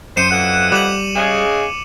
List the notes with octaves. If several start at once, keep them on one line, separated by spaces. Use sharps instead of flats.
F#2 C5 C#7 D#7 E7
F2 E3 F#5
G3 D6 E7 F#7
C#3 G#3 G#4